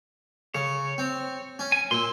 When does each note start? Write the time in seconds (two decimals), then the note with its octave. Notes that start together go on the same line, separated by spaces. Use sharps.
0.55 C#3 C#5
0.98 C4
1.59 C#4
1.72 G#5
1.91 A#2 C6 E6